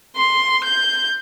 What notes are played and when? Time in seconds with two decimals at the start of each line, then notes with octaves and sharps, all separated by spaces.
0.17 C6
0.64 G6